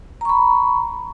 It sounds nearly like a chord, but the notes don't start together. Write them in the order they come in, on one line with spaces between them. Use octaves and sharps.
A#5 C#6 B5